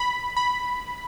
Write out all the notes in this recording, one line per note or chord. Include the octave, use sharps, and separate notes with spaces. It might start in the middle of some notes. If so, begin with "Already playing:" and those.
Already playing: B5
B5